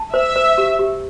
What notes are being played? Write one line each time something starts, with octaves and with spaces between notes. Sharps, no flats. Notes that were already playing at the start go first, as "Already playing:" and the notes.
Already playing: A5
C5 E5
C5
G4
G4